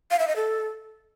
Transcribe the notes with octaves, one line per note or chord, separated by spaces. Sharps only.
F5
E5
D#5
A4